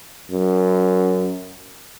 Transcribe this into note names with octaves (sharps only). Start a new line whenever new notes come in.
F#2